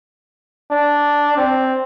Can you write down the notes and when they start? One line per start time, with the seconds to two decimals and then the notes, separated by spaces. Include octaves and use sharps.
0.71 D4
1.37 C4